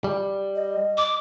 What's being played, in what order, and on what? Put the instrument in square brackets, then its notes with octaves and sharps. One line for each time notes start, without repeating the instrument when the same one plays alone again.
[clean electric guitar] G3
[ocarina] D#5
[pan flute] D6